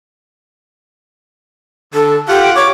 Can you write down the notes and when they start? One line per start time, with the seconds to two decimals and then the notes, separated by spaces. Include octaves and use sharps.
1.94 D3 A4
2.28 F4 G4 F#5
2.43 G5
2.55 C#5 D6